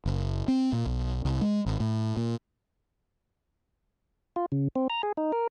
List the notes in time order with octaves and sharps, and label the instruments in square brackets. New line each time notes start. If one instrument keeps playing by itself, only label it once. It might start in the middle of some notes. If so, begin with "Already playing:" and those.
[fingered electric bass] F#1
C4
A#2
B1
C2
G#3
G#1
A2
A#2
[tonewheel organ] F4
C#3
C4
A#5
G#4
D#4
A#4